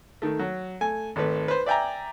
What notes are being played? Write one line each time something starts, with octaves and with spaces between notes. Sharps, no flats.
D#3 A3
F#3
A3 G#5
G#1 A3 B4
B4 C5
D5 E5 G5 G#5 A#5